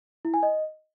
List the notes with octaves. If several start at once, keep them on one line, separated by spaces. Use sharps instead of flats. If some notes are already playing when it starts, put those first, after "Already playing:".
E4
G#5
D#5